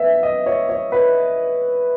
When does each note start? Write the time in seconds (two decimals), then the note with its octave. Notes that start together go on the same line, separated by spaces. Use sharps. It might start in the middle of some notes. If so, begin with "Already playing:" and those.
Already playing: B3 E5
0.23 D#5
0.46 C#5
0.69 C#5
0.92 B4